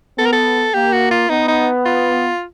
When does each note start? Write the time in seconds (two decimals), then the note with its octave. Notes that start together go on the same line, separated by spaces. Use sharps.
0.18 B3 A4
0.26 A#4
0.33 A4
0.74 A#3 G4
0.93 F#4
1.11 F4
1.29 B3 D#4
1.48 D#4
1.85 F4